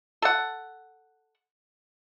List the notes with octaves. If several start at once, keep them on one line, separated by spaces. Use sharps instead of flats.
A4 F#5